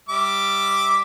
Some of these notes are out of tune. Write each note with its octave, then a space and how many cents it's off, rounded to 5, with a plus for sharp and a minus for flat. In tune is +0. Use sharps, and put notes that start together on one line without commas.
G3 +0 E5 -10 D6 +0